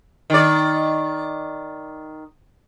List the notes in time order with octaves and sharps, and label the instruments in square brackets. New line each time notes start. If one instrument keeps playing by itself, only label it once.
[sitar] D#3 D5